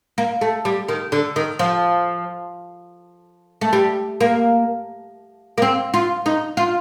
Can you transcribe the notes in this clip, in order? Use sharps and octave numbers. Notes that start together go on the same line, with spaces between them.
A#3
A3
G3
D#3
D3
D#3
F3
A3
G3
A#3
A#3
C4
F4
D#4
F4